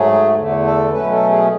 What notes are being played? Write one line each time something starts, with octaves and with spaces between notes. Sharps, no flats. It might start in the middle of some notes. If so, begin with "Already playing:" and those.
Already playing: G#2 F#3 A3 G#4
E2 D3 A3
A4
B2 F#3 A3 C#4 B4
A4
G#4